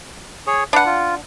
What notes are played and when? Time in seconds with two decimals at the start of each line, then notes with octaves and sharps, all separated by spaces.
0.47 G#4 C#5
0.73 D4 B4 F#5
0.86 F4